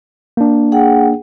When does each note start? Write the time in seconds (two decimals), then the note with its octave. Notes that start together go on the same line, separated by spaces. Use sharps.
0.37 A#3 D4
0.72 G#4 F#5 G5